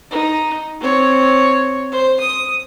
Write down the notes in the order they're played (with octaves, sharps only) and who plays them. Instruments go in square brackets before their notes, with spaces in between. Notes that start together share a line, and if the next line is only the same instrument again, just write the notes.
[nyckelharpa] D#4
C4 C#5
C5
D#6